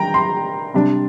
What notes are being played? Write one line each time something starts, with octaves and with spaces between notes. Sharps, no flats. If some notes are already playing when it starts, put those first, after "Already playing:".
Already playing: D#3 G3 D4 G5 A#5
C6
C3 G3 D4